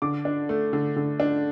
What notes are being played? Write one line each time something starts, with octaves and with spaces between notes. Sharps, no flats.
D3 D6
D4
A3
D3
D3
D4